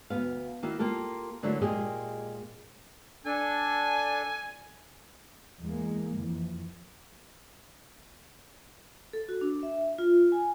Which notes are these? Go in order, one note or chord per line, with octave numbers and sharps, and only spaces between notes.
D2 B3 F5
D#3 A#3 E4 F#4
A#3 F4 G4 A4
D3 F#3 A3 A#3 D4 E4
A#2 G#3 A#3 G4 G#4 D#5
D4 A4 G#5
E2 G#3 A#3
F2 E3
A4
F#4
D4
E5
F4
G#5